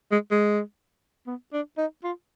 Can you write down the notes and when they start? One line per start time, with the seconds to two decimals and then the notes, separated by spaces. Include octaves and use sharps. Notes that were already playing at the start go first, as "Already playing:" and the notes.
0.12 G#3
0.31 G#3
1.27 B3
1.53 D4
1.78 D#4
2.04 F4